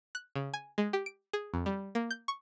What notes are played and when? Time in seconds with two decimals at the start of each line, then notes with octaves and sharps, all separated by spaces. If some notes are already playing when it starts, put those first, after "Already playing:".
0.15 F#6
0.35 C#3
0.54 G#5
0.78 G#3
0.93 G4
1.06 D7
1.33 G#4
1.54 F2
1.66 G3
1.95 A#3
2.11 G6
2.28 C#6